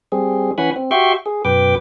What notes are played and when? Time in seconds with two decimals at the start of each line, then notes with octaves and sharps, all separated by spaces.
0.12 G3 C4 G#4
0.58 E3 C#4 F#5 G#5 B5
0.76 C4
0.91 F#4 G4 E5 G5 C6 C#6
1.26 G#4
1.45 F#2 B2 B4 G5 D6